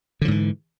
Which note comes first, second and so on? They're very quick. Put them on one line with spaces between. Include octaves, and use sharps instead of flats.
D3 F3 G#2 E3